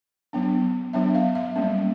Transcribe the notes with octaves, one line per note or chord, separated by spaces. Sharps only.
F#3 B3 D4
F#3 B3 D4 E5
F5
E5
G3 A#3 C#4